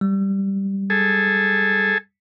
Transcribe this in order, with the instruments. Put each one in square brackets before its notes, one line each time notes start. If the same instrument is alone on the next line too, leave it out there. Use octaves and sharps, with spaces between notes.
[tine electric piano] G3
[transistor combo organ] G#4 A4